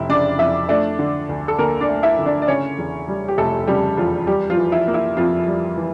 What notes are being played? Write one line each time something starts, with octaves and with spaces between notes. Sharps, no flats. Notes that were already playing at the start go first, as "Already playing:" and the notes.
Already playing: F1 E4
C#3 D4 D5
F2 E4 E5
A3 D4 D5
D3
D2
A4
D2 A#3 A#4
D4 D5
A3
E4 E5
D3
D4 D5
D5
C#3 C#4 C#5
E2
G3
G4
F1 A3 A4
C#3 G3 G4
E2 F3 F4
G3 G4
F3 F4
E3
E4
A#3
E4
F2 F3 F4
G3
E3